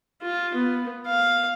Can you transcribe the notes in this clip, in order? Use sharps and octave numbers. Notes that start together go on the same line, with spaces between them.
F4
B3
F5